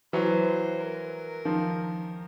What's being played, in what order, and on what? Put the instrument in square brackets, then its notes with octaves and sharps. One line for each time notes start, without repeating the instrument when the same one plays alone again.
[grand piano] E3 F#3 [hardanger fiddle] C5
[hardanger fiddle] A#4
[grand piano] D#3 F3